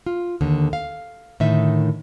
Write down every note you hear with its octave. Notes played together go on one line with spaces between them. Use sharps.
F4
D#2 D3
F5
A2 D3 D#3 D#4 E5